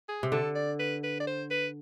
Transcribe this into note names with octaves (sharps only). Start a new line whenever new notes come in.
G#4
C3
D3 A4
D5
B4
B4
D5
C5
B4